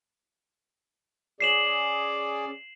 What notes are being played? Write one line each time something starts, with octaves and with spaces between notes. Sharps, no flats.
C#4 G#4 D5 C7 E7 F#7